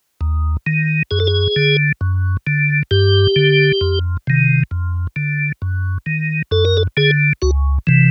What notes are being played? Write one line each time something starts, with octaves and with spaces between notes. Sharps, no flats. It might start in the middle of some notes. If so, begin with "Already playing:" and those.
D#2
D#3
F#2 G#4
A4
G#4
D3
F#2
D3
G2 G4
D3
F2
C3 D#3
F2
D3
F#2
D#3
F#2 A4
A#4
A4
D3 G#4
C#2 F#4
C3 E3